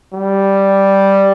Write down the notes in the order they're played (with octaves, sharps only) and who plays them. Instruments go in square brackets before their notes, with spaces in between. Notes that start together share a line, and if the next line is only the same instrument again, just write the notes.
[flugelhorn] G3